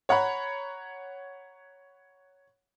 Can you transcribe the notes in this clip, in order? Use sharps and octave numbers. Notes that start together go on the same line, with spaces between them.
C#5 F#5 A#5 B5